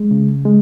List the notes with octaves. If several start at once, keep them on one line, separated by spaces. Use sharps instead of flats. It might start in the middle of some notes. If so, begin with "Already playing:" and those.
Already playing: G#3
C#3
G#3